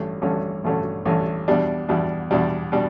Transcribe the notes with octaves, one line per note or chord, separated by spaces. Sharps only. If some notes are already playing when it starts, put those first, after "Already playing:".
Already playing: A1 G2 D3 A3 C#4
A1 G2 D3 A3 C#4
A1 G2 D3 A3 C#4
A1 G2 D3 A3 C#4
E2 B2 G3 D4
E2 B2 G3 D4
E2 B2 G3 D4
B2 G3 D4